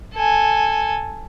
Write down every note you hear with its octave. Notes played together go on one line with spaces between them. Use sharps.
A4 G#5